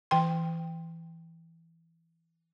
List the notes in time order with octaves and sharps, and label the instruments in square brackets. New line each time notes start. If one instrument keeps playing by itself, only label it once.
[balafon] E3 G5 C6